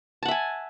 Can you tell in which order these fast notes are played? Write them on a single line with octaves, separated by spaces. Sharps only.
A5 F#5 E5 G#5